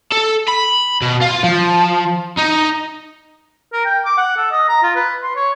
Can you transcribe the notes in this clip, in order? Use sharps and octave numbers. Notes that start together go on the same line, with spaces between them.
A4
B5
B2
F4
F3
D#4
A#4
G5
D6
F#5
A4
D#5
A#5
F4
B4
C6
C#5